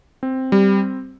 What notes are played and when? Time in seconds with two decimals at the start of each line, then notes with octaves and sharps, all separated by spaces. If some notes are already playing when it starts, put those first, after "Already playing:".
0.23 C4
0.52 G3